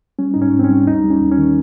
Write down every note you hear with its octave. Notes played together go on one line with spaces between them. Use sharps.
G3 C#4
G#2 D#4
C#4
G#2
C4
C#4
G3
D#2 D#4
G3
C#4
D#2
C#4
D#3